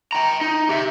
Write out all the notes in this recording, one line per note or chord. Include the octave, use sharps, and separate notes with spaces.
G5 A#5
D#4
G4 E5